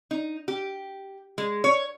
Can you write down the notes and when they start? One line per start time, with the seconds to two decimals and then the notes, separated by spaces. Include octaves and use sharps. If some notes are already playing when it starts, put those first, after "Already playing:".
0.11 D#4
0.48 G4
1.38 G#3
1.64 C#5